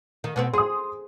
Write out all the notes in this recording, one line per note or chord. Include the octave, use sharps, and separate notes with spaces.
D#3
B2 B3 C4
G#4 C6 D#6